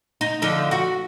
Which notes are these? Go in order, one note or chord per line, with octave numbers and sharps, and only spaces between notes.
D#4
D3 F3 D#4
F#4